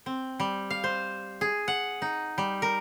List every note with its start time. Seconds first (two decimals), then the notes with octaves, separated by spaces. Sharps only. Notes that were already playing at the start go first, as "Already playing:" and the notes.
0.06 C4
0.40 G3
0.70 F5
0.84 C5
1.41 G#4
1.68 F#5
2.02 D#4
2.38 G3
2.62 A#4